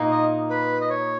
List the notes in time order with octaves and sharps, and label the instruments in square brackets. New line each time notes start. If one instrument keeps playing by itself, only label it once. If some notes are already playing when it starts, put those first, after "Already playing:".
Already playing: [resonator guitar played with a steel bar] A#2 A#3 D#4
[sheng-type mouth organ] D#5
B4
D#5
C#5